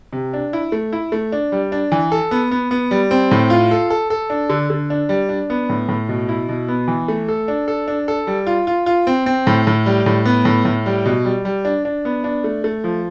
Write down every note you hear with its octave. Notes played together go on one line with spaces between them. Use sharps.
C3
D4
E4
A3
E4
A3
D4
G3
D4
E3
A4
B3
B3
B3
G3
C4
A2
F4
A4
A4
A4
D4
D3
D3
D4
G3
D4
B3
A2
A2
B2
E4
B2
B3
E3
A3
A4
D4
A4
D4
A4
G3
F4
F4
F4
C4
C4
A2
A2
G3
A2
B3
A2
A2
G3
B2
G3
G3
D4
D4
B3
D4
A3
A3
F3